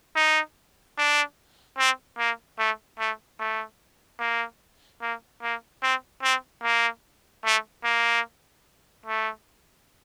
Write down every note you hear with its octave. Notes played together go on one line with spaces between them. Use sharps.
D#4
D4
C4
A#3
A3
A3
A3
A#3
A#3
A#3
C4
C4
A#3
A3
A#3
A3